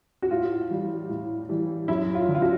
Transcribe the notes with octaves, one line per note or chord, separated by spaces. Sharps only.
F#4
A2 F4
E3 G3
A2
E3 G3
F#2 E4
F4
D3 F3
F4
F#4